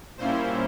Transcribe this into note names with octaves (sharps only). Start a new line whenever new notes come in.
A#2 G3 A#3 C#4 E4 C5